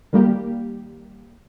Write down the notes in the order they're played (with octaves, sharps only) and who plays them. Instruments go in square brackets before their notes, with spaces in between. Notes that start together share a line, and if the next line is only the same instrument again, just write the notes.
[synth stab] D#3 G3 A#3 G4